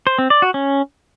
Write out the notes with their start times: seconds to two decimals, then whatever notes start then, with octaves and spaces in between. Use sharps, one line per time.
0.07 C5
0.18 C4
0.30 D5
0.42 F#4
0.54 C#4